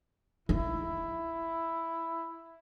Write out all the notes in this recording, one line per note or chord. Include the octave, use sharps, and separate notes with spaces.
D#4 E4